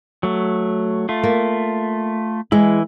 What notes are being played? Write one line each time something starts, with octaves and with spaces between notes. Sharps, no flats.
F#3 A3
A3 F4
A#3
E3 G#3 E4